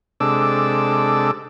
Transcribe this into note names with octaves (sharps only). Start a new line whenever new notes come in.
C3 G#3 D4 A4 D6 E6